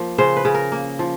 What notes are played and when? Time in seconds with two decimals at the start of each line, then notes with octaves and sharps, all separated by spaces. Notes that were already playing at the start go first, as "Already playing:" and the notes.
Already playing: F3 A#3
0.18 C#3 C5
0.37 B4
0.45 C#3
0.54 A#4
0.72 A#3
0.99 F3